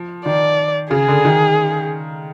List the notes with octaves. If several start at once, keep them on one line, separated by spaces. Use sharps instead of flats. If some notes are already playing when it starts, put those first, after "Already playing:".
Already playing: F3
D#3 D5
C#3 G#4
D3
D#3